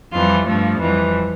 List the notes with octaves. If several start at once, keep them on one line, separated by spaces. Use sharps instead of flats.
F2 E3 G3 F4
G2 F3 A3
F2 E3 G3